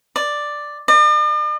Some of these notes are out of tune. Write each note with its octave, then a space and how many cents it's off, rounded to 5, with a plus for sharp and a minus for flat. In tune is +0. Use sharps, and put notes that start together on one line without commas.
D5 +5
D5 +45